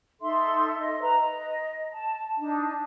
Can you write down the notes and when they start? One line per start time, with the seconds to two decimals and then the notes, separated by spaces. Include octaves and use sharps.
0.21 D#4 A4 E5 C6
0.79 D#5
1.01 B4 A#5
1.19 D#5
1.91 A5
2.37 D4 D#4